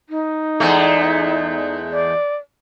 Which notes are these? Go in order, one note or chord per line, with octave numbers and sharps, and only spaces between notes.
D#4
E2 G#3 A3
D5